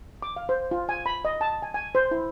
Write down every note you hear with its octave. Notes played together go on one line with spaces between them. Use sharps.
D6
F5
C5
F4
G#5
B5
D#5
A5
G#5
G#5
C5
E4